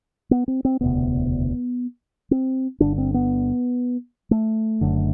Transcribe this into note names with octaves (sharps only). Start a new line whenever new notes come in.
B3
C4
C4
E1 D2 C3 B3
C4
G1 G2 D3 D4
C4
B3
A3
F#1 F#2 D3